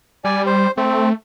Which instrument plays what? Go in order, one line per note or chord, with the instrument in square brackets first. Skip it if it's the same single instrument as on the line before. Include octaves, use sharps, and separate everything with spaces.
[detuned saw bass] G3 [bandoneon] D5 G#5
[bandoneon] C5
[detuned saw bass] A3 [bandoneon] C4